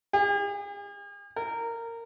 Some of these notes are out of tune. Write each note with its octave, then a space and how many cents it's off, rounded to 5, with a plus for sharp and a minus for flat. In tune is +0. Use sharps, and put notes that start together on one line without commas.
G#4 -45
A#4 -15